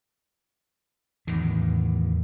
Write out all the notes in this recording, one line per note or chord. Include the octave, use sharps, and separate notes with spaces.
E2 A2 D#3